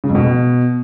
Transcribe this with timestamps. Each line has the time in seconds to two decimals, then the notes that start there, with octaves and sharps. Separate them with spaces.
0.04 C#3
0.09 F2
0.15 B2